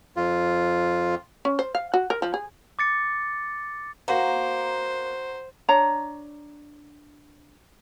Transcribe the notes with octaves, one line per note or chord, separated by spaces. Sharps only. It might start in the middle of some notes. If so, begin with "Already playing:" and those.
F2 F4
C#4
C5
F5
F#4
A#4
F3
G#4
D6 A6 C#7
A#3 F#4 C5 F#5 A#5
D4 C#5 A#5